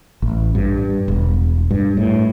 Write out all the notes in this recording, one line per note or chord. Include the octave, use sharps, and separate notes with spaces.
A1
G2
E1
G2
A2